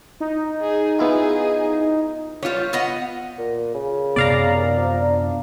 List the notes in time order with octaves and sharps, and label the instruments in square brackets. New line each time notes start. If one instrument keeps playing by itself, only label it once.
[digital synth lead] D#4
[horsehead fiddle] G#4
[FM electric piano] B3 E4 F4 [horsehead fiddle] G#4
[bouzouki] G3 B3 [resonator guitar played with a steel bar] F4 C#5
[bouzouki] B3 D#5 F#5
[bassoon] A#2
C#3
[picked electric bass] F#2 C3 B3 [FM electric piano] D5 F5 A#5
[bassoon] D#2
F3
D4